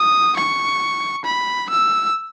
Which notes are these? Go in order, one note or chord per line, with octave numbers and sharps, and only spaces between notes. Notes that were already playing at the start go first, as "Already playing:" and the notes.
Already playing: D#6
C#6
B5
E6